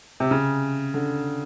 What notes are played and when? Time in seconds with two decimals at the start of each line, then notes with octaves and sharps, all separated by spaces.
0.20 C3
0.31 C#3
0.94 D3